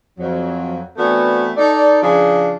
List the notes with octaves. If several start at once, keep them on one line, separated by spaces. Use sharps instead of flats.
F2 F#3
E3 A3 B3 C4 D4 F#4
D#4 A4 D5
C#3 F3 D4 G#4